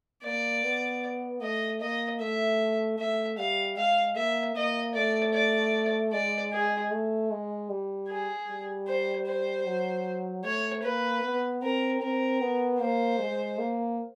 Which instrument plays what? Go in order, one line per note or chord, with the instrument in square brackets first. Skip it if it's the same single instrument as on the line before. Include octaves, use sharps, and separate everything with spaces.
[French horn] A#3 [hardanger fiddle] D5
[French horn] B3
[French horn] A3 [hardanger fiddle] D#5
[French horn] A#3 [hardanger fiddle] D#5
[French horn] A3 [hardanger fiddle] E5
[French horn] A3 [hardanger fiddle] E5
[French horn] G3 [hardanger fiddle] F5
[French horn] G#3 [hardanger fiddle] F5
[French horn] A#3 [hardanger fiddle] E5
[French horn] A#3 [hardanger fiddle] D#5
[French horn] A3 [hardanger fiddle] D5
[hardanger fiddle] D5
[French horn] G#3 [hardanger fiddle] D5
[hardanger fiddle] G#4
[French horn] A3
G#3
G3
[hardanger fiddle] G#4
[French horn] G3
[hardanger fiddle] C5
C5
[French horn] F#3
[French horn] A3 [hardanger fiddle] C#5
[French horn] A#3 [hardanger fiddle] B4
[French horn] B3
[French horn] C4 [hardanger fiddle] A#4
[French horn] C4 [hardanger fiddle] A#4
[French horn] B3
[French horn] A#3 [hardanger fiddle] C5
[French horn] G#3
A#3